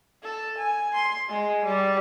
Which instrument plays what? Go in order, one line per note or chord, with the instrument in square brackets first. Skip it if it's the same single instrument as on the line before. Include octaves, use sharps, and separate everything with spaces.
[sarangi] A4
G#5
C6
G#3
G3